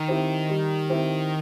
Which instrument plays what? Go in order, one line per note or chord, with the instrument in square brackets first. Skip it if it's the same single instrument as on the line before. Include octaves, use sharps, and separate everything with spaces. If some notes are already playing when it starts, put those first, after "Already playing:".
Already playing: [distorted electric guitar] D#3
[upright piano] C4 E4 G4
G3
C4 E4 G4